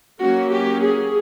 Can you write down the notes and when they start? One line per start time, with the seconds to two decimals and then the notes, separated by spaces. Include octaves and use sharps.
0.21 F#3 A#3 C#4 F#4
0.52 G4
0.82 G#4